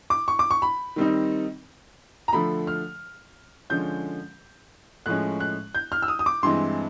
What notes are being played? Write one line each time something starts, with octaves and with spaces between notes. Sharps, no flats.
D6
C#6
D6
C#6
B5
D#3 G3 C4 D#4
A#5
D3 F3 A3 B5
F6
D3 F3 G#3 C#4 G6
A2 F3 G#3 C#4 F#6
F#6
G6
F6
E6
D#6
D#6
D6
G2 E3 G#3 C4 C6